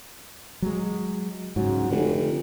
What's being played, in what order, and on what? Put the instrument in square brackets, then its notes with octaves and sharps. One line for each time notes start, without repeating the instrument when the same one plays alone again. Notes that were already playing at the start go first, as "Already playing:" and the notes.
[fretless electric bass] F#3 G#3
[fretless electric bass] G#2 C#3 [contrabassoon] F#3
[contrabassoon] F1 [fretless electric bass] D3